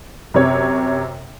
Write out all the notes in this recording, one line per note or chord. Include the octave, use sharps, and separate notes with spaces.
F#2 C3 C#5